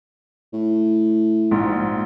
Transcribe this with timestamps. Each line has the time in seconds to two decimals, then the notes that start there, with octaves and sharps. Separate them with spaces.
0.53 A2
1.51 A#1 G#2